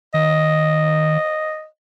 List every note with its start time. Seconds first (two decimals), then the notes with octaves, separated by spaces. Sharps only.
0.14 D#3 D#5